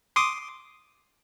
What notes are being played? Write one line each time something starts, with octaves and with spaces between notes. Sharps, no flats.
C6 D6 D#6